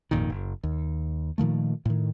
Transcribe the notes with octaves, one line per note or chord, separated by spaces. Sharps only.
G#1 F2 A#2 D#3
F#1
D#2
A#2 D#3 F3 A3
A2 D#3